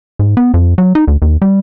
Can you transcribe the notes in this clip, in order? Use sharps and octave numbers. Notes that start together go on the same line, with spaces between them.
G#2
B3
F2
F#3
D#4
D2
D#2
G3